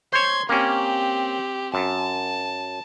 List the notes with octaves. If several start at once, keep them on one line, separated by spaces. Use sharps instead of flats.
C5 C#5 C6 G#6
A#3 C4 C#4 G4
F#2 A5